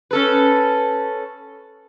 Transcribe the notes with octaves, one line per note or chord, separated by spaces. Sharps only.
C#4 A4 B4